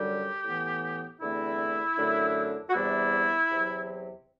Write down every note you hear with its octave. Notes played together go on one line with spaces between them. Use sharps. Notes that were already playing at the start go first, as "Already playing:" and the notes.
Already playing: F#2 D3 G3 G4
A2 E3 B3
E2 D3 A3 C4 E4
F#2 D3 A3 D4
F#4
E2 C3 G3 B3 D4 E4
E2 C3 F#3